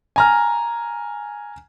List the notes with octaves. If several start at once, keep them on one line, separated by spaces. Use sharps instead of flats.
G#5 A#5 F6